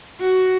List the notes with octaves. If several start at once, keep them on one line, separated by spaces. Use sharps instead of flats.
F#4